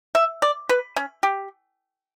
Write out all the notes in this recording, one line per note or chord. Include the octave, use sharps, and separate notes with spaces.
E5
D5
B4
C#4
G4